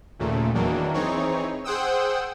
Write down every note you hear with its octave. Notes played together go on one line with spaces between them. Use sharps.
D#2 A#2 C#3 A3
E2 D#3 E3 F#3 A#3 D4
E3 C4 D#4 G#4 C#5
G#4 C5 F#5 G5 D#6 E6